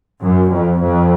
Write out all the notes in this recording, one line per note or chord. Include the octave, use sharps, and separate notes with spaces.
F#2
F2
F2